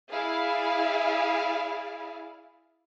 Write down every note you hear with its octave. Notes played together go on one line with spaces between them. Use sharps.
E4 G#4 D5 E5 F5